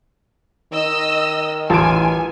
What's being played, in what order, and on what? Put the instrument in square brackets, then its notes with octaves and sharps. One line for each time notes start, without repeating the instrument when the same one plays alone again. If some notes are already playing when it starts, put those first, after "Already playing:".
[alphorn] D#3 [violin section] D#5 E6
[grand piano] A1 D7 [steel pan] F4 A5 [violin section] G#5